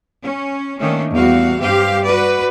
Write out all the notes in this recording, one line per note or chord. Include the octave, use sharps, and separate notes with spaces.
C#4
D#3 A3 A#3 C#4 D4
E2 G3 F#4 F5
G2 C4 G4 F5
F#4 B4 D5